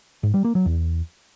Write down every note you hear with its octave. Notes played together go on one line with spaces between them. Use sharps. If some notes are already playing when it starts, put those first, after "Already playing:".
G#2
G3
A#3
F#3
E2